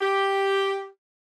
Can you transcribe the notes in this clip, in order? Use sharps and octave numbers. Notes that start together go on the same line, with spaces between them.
G4